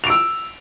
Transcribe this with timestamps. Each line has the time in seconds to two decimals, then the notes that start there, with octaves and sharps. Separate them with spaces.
0.04 F7
0.07 D7
0.10 E6